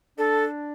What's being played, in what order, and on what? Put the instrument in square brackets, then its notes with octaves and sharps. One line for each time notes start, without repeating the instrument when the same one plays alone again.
[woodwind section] D4 [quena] A4